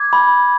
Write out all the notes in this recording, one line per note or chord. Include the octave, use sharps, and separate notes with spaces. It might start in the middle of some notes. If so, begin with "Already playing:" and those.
Already playing: D6 G#6
B5